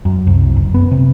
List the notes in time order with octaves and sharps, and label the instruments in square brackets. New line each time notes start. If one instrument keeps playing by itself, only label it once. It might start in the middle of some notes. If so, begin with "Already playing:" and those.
[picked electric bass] F#2
C2
F#1
B3
C3